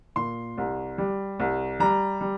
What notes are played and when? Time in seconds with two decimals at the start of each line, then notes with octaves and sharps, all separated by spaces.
0.16 A#2 C6
0.58 C2
0.98 G3
1.40 C2
1.80 G3 A#5
2.21 G3